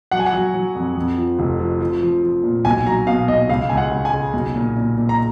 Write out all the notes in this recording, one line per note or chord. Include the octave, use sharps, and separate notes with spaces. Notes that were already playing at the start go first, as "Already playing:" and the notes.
F#3 F#5
G#5
F#5
F#3
F#3
F2
F2
F3
F1
F3
F3
F3
F3
A#2
B1 G#5
F#3 A#5
B2 F5
B1 D#5
C#2 F5
C#2 G#5
F#5
C#2
G#5
C#3
B1
A#2
A#2
A#2
A#5